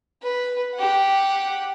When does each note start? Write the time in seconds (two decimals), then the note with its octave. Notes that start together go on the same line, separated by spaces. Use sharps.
0.23 B4
0.75 G4 F#5